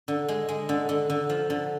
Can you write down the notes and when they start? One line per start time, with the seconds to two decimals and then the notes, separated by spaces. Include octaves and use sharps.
0.08 D3
0.29 G#3
0.49 G#3
0.69 D3
0.89 D3
1.10 D3
1.29 F3
1.50 D3